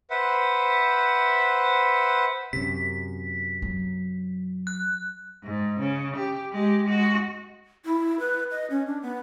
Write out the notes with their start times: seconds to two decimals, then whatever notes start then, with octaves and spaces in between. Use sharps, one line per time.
0.10 B4 C5 E5 F#5
2.53 F#2 C3 B6
3.62 F#3
4.67 F#6
5.43 G#2
5.79 C#3
6.16 G4
6.52 G#3 G4
6.85 G#3 F#4
7.85 E4
8.19 B4
8.51 D#5
8.70 C#4
8.87 D4
9.02 B3